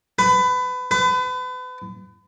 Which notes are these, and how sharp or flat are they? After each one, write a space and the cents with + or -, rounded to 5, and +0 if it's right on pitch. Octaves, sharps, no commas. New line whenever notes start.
B4 +25
B4 +35